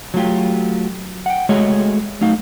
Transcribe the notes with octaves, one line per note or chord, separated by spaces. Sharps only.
F#3 A3 F4 G4
F#5 G5
G#3 A3 F#4 G#4 C#5 D#5
F#3 A3 D#4 F5